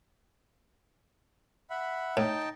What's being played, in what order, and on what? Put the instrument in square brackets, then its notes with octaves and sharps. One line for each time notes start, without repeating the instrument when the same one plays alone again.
[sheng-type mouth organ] E5 F#5 B5
[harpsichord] A2 [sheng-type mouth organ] D#4 G5 A5